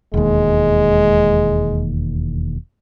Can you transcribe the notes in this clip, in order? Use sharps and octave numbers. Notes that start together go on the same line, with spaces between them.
E1 D#2 G#3